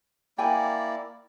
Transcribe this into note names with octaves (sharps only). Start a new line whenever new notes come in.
A#3 E4 D5 G5 G#5